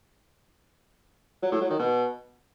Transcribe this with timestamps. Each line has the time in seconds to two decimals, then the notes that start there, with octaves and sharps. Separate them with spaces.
1.43 F#3
1.52 A2
1.61 F#3
1.70 D#3
1.79 B2